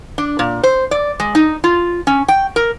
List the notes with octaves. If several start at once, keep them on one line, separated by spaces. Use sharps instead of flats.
D4
A#2
C5
D5
G#3
D#4
F4
C#4
G5
A#4